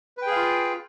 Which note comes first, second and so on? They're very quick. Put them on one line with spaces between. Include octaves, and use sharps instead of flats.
B4 G5 G#4 F5 F4